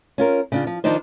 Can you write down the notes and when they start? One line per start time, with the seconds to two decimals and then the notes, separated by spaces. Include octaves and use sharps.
0.18 C#4 F4 A#4
0.52 C#3 D4 F4
0.67 F3
0.84 D#3 F3 D4 D#4 C5